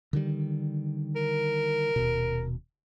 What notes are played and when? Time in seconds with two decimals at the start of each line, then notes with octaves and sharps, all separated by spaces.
0.13 D3 D#3 G3
1.16 A#4
1.96 D#1 B2